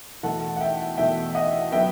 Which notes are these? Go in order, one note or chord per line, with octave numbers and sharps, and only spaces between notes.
E2 B2 A3 F#5 A5
F#5
E5 G5
E2 B2 A3 E5 G5
D#5 F#5
F#3 B3 E5 G5